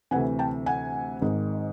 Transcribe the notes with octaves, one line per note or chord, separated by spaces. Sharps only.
D2 C3 E3 F#5 G#5
G5 A5
F#5 G#5
G#1 G#2 D#3